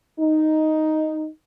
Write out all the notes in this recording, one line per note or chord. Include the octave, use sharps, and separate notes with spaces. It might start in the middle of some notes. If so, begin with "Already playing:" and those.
D#4